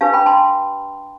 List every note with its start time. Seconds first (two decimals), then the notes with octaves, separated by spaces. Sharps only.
0.01 D4 G4 B4 F5 A5
0.14 G5 B5
0.26 A5 C6